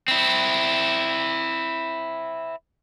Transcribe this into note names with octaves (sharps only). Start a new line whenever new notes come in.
C4 E4